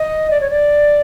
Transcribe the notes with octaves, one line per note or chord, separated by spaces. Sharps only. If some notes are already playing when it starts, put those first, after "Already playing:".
Already playing: D#5
D5
C#5
D5